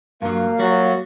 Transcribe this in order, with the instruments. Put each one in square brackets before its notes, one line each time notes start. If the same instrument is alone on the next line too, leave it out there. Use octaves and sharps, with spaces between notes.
[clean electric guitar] G2 F#3 [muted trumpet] A#3 [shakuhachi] F5
[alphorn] F#3 [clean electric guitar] G3 F#4